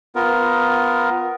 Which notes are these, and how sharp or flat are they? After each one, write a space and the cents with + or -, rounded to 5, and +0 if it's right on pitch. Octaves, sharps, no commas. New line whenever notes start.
B3 +20 F4 +0 A#4 +15